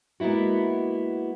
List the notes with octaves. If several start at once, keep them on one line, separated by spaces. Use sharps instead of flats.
G#3 A#3 B3 E4 F#4